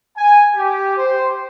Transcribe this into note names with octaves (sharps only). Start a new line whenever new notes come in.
G#5
G4
C5